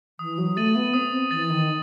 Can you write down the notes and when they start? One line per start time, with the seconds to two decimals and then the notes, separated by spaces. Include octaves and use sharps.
0.19 E3 D#6
0.38 F#3
0.57 A3 A6 D#7 F#7
0.75 B3
0.94 C4 D#6
1.31 E3 A6 D#7 F#7
1.50 D#3